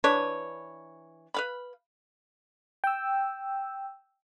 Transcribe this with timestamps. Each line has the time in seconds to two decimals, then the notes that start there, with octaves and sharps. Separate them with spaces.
0.04 E3 D4 B4 C#5
1.34 B4 F5 B5
2.84 G5 E6